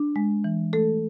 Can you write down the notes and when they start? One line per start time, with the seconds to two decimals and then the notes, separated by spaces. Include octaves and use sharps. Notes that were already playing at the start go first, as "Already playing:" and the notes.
Already playing: D4
0.16 G#3
0.44 E3
0.73 A3 A4